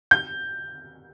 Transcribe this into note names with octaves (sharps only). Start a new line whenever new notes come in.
G6